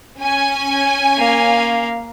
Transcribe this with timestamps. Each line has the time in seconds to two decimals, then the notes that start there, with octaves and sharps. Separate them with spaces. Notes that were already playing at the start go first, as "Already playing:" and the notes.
0.20 C#4 G#5
1.17 A#3 F5